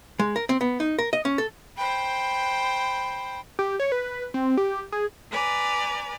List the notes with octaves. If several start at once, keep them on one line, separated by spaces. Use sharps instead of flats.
G#3
A#4
C4
B3
D#4
A#4
D#5
C#4
A4
C5 G5 B5
G4
C#5
B4
C4
G4
G#4
B4 D5 G#5 A#5